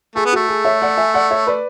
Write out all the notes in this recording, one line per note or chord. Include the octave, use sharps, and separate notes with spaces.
A3 G#4
B3
A3 F#4
G#4
C#5 E5
D5 F#5
E5 G#5
D5 F#5
C#5 E5
B4 D5